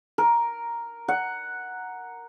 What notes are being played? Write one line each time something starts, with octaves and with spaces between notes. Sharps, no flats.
A#4
F#5